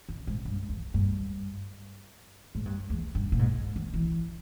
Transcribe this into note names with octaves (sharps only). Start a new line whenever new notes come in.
D#3
G#2
G2
E2
G2
G#2
G2
E2
G2
A#2
G#2
D#3
E3